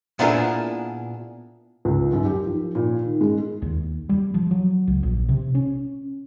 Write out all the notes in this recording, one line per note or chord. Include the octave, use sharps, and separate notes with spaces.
A#2 B3 D4 E4 G#4 A#4
C#2
F#2
G4
F3
A#2
D#3
G#3
D#2
G3
F3
F#3
C#2
A#1
C3
C#4